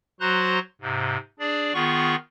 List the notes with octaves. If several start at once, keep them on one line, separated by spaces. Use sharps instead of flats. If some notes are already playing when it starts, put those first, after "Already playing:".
F#3 F#4 C5 A#5 C6 F#6
G#2 C3
D4 G#4 D5
D#3 B3 F4 G#4 C#6